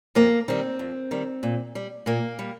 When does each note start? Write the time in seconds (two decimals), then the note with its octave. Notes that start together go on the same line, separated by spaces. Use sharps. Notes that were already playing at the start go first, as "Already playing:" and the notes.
0.15 F2 A#3
0.48 D#3 G3 C4
0.79 F2
1.11 D#3 G3
1.43 A#2
1.75 G3
2.06 A#2 A#3
2.39 G3